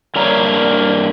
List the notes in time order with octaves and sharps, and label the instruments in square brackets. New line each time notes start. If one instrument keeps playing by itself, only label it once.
[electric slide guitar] G2 A#3 D4 C#5 A#5